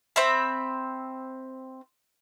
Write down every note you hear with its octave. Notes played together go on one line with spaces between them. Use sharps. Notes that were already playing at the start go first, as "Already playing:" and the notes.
C4 E5 B5